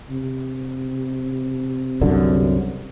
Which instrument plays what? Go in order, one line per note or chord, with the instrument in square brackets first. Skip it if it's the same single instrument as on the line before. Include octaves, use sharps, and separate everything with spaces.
[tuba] C3
[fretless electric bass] C2 F#2 D3